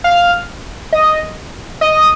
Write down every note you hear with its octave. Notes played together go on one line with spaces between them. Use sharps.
F5
D#5
D#5